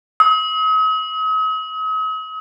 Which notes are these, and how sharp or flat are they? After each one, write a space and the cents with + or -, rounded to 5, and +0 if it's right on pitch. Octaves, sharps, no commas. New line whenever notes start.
D#6 +45